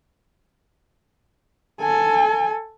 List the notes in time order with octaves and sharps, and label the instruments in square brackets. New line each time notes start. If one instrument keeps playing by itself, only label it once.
[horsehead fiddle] A4 G#5